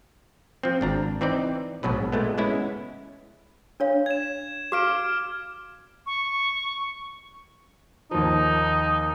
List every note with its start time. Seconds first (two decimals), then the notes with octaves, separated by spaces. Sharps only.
0.63 F3 C4
0.81 G#1 D4 A#5
1.21 E3 C4 D#4 D5
1.83 A#1 G#2 B2 F#3 B4
2.12 A#2 G#3 A3 B3
2.38 G#3 B3 C#4 E4
3.80 D4 C#5 F5
4.06 G#6 E7
4.72 F#4 F5 D6 F6 D7
6.06 C#6
8.11 D#2 F3 D#4